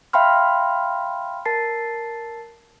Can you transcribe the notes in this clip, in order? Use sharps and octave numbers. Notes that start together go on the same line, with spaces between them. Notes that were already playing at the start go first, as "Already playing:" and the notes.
E5 F5 G5 B5 C6 F6
A#4 A5 A6 C7